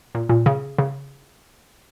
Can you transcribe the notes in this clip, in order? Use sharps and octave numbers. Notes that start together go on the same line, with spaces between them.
A#2
A#2
C#3
C#3